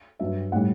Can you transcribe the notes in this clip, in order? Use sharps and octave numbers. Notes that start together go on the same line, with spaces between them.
G2 F#3 E5
A2 G3 F#5